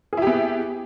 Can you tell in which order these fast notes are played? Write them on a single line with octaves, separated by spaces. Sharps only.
G#4 E4 G4 B3